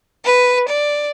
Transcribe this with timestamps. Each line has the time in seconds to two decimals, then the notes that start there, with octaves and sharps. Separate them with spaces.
0.25 B4
0.69 D5